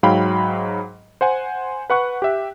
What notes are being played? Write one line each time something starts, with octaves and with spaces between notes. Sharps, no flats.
G#2 F#3 F5 G5 B5
C5 F#5 G#5
B4 F#5 C#6 F#6
G4 E5